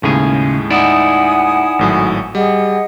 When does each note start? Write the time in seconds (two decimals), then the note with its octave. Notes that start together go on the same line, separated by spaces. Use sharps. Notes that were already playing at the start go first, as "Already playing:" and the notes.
0.03 D#2 A2 C#3 G#3 G#4
0.70 D#4 E4 D5 F#5 G#5 D#6
1.79 G#1 A2 F#3
2.35 G3 G#4 D#5 F#5